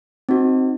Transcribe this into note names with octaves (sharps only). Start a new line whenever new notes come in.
C4 D#4 F#4